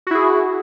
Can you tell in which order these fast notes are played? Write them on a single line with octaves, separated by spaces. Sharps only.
F#4 E4 G#4